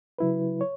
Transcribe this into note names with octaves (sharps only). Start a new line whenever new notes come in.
C#3 F#3 E4 B4
C#5